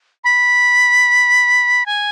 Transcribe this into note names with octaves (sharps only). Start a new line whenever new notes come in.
B5
G#5